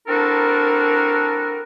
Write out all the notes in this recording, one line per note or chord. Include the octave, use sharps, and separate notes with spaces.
C4 D4 E4 F#4 A4 A#4